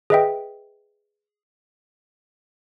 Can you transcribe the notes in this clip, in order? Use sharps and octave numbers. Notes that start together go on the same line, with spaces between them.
G#4 B4 D#5 E5 G5